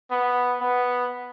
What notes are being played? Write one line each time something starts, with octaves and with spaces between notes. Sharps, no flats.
B3
B3